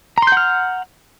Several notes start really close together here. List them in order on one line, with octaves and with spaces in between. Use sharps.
A#5 C6 G6 F#5 F6